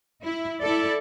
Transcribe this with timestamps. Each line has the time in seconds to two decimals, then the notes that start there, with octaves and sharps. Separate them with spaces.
0.24 E4
0.62 E4 A4 D5